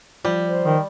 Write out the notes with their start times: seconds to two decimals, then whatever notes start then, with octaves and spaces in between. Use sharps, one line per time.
0.25 F3 G3
0.48 C5
0.64 D#3